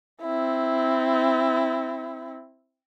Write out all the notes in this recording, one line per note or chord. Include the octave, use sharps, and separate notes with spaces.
C4 E4